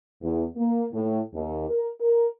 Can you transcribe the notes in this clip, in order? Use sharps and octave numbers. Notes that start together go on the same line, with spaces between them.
E2
A#3
A2
D#2
A#4
A#4